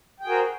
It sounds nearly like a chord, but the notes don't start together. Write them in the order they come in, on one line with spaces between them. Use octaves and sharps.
G5 G#4 F#4 A#4 C5